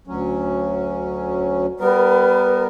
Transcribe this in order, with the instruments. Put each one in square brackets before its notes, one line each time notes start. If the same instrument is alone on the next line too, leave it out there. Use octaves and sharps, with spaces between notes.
[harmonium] D2 F#3 C#4
[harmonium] G3 B3 A#4 [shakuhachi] B4